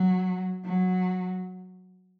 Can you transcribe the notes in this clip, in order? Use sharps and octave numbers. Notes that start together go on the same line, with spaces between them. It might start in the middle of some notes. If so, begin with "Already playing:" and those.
Already playing: F#3
F#3